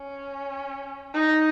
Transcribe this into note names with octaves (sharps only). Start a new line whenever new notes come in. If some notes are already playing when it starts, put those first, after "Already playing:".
Already playing: C#4
D#4